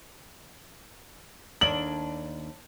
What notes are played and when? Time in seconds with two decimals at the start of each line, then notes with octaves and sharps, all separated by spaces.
1.61 D#2 D4 F#7